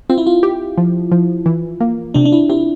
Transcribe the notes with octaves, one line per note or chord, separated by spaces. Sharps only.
C4 F4
E4
F4
G4
F3
F3
E3
A#3
C3 D4
D4
E4
C3 E4